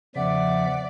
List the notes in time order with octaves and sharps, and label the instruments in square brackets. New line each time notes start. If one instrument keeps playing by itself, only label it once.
[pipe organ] E2 F3 E5 [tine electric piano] C#3 [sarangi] D5 [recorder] F#5